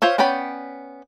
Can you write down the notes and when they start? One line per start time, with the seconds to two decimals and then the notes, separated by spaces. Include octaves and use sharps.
0.02 F4 C5 C#5 E5
0.18 B3 C#4 D5 G5 B5